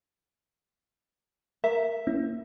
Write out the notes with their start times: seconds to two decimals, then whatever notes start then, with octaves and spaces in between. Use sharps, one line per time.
1.64 A#4 E5
2.07 A#3 C#4 E4